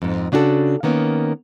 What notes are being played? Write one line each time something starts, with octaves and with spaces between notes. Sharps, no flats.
F2 G#2
C#3 D4 F#4 G4 A4
D#3 A#3 B3 C#4